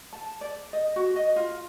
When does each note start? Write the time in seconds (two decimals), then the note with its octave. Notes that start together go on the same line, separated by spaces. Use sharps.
0.13 A5
0.41 D5
0.73 D#5
0.96 F#4
1.16 D#5
1.36 F4